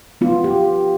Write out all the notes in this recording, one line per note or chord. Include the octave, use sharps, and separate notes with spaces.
B3 F4
G4